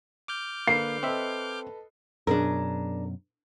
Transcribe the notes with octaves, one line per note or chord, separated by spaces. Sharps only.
D6 F6 G6
D3 A#3 B4 C7
C4 A4 B4 D#5 E5
F#2 B2 D4 G#4 A#4